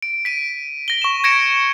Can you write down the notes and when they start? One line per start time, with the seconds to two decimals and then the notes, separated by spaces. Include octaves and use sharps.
0.02 D7
0.25 B6 D7 D#7
0.88 A#6 G7
1.02 C#6 E7
1.24 G#6 A#6 C#7 D7 E7